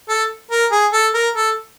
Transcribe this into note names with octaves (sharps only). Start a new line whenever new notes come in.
A4
A#4
G#4
A4
A#4
A4